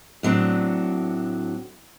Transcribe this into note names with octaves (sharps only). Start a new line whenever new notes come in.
A2 F#3 C4 D4